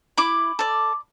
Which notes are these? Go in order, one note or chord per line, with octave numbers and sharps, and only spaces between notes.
E4 B5 D6
A4 D5